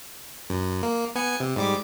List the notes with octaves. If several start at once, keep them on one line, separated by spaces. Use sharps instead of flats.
F#2
A#3
B3 G#5 C#7
C3
G#2 G3 D6